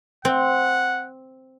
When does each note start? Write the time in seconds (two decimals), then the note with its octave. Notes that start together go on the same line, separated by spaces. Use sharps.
0.25 C4 F#5